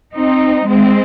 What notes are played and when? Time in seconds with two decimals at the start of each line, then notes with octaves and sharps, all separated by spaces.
0.14 C4 D#4
0.66 G#3 C4